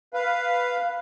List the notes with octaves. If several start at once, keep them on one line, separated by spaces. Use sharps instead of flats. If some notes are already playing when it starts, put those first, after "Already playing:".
B4 F5